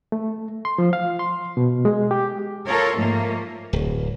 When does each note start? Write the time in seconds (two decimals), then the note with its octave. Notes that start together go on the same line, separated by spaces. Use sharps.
0.12 A3
0.65 C6
0.78 F3
0.93 F5
1.19 C6
1.57 B2
1.85 G#3
2.11 G4
2.66 F4 A4 A#4 C#5
2.96 G#2 F3 A3 A#3
3.73 D1